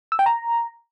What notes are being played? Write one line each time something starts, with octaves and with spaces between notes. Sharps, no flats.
E6
G5
A#5